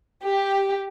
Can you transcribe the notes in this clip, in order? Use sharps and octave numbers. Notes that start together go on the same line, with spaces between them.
G4